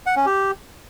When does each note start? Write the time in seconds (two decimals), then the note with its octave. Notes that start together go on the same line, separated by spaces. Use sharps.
0.06 F#5
0.16 C#4
0.26 G4